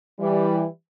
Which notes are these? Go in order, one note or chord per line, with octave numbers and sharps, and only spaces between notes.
E3 G3